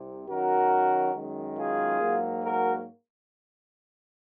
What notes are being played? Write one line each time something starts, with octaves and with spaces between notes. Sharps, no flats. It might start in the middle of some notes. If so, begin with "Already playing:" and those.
Already playing: C2 C3
F#2 D#3 F#3 F#4 A#4
F#2 D#3 G#3
F4 G#4
G#2 F#3 A#3
F#4 A#4